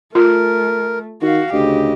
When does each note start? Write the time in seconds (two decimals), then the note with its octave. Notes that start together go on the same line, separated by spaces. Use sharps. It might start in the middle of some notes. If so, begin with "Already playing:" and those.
0.15 A3 F4 A#4
1.22 D#3 F#4 F5
1.53 D2 C#3 G4 D#5